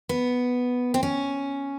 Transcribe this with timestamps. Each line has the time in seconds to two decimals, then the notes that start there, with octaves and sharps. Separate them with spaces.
0.09 B3
0.94 C4
1.03 C#4